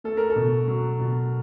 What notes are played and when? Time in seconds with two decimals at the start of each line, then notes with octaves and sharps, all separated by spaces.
0.04 A3 A4
0.17 A#4
0.30 A4
0.36 B2
0.68 F#3
0.99 B2